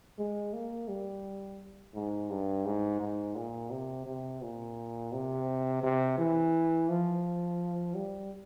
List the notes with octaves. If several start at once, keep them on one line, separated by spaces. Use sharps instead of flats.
G#3
A#3
G3
G#2
G2
G#2
G#2
A#2
C3
C3
A#2
C3
C3
E3
F3
G3